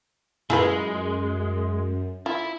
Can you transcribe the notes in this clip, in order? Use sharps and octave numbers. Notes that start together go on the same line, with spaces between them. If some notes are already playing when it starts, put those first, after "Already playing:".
F#2 G#3 E4 F4 G#4 B4
E4 F4